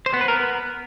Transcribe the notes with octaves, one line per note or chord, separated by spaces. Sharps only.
C5
B3
B4
A#4
B3